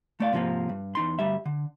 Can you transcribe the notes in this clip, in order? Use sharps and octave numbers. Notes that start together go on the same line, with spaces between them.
A3 D5 F5
G#2 C3 F3 G#3 A#3
G2
E2 D#4 C6
D2 G2 G3 E5
D3